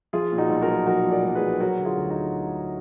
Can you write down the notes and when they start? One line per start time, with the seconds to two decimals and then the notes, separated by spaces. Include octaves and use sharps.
0.13 F3 F4 G#4
0.32 A#2
0.38 D#4 F#4
0.49 B1
0.62 F#4 A#4
0.68 B1
0.87 F3 F#4 A#4
1.06 A#2
1.12 A#4 D5
1.24 B1
1.35 G#4 B4
1.42 B1
1.61 F#3 F#4 A#4
1.79 D3
1.85 F4 G#4
1.97 D2
2.10 D#4 F#4